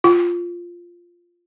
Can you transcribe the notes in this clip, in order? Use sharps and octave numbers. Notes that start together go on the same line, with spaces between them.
F4